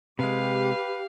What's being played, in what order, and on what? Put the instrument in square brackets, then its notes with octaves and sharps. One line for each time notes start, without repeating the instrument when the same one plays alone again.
[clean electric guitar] C3 G#3 [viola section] G4 [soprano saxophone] B4 [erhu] F5